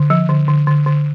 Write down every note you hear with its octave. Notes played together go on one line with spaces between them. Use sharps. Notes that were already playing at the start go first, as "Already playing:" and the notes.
Already playing: D3
F3
D3
D3
D3
D3